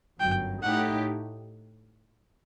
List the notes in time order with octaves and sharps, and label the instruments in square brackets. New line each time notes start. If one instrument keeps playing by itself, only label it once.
[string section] G1 F#2 F#3 [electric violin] G5
[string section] A2 A3 D#4 G4 [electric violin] F#5